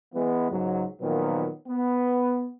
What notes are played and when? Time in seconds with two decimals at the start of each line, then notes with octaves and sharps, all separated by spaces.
0.14 E3 G#3 B3
0.52 C#2 G#2 F#3
1.02 A#2 D#3 F3 F#3 B3
1.68 B3